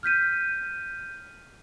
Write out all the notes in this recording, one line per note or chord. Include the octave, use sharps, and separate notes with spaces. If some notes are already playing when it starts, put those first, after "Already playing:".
F6 G6 B6 D#7